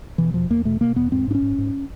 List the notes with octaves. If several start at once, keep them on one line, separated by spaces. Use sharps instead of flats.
B2 E3
E2 F3
E2 A#3
B2 A3
B2 A#3
E2 B3
G#2 C4
G#2 D4
C#4
G#2
G#2